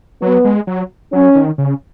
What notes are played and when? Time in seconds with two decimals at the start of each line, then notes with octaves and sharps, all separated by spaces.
0.22 F#3 B3
0.45 G#3
0.67 F#3
1.13 F#3 C#4
1.35 D#3
1.58 C#3